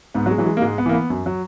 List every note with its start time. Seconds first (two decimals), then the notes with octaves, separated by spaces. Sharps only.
0.14 G#2 B3
0.26 F#3
0.31 G#3
0.38 E3 F#3
0.46 G#3
0.57 A#3
0.62 G#2 G#3
0.78 B3
0.86 E3 A#3
0.93 B3
1.10 F#2
1.26 F#3